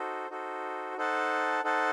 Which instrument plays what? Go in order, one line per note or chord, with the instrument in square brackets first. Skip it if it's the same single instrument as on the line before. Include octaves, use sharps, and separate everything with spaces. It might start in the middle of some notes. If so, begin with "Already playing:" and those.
Already playing: [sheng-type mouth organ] D#4 F#4 A4 C5
D#4 F#4 A4 C5
D#4 A4 C5 F#5 A5
D#4 A4 C5 F#5 A5